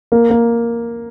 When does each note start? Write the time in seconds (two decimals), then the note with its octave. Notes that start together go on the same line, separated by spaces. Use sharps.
0.12 A#3
0.30 A#3